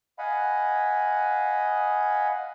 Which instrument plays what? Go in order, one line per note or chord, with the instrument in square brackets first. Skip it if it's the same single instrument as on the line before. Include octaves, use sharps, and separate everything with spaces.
[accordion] D#5 F5 F#5 G#5 B5